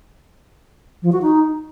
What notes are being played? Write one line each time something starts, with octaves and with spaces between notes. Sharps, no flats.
F3
F#4
D#4